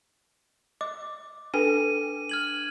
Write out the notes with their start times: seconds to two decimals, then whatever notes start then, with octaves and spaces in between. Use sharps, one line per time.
0.81 D#5 D6
1.54 D4 A4 B4 G#5 D#7
2.29 F6 G#6 F#7